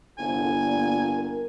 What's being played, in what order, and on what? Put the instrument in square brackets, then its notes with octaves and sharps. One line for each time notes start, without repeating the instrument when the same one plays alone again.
[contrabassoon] G1 [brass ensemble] C2 A2 [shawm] G#5
[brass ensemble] A#2
A#4